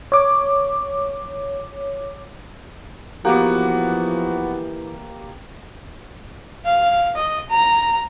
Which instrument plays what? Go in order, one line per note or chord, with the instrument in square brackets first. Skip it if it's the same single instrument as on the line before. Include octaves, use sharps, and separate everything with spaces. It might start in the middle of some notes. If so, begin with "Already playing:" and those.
[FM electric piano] C#5 D6
[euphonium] E3 [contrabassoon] F3 [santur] A#3 G4 [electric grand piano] B3 F#4 F#5
[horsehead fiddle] F5
D#5
A#5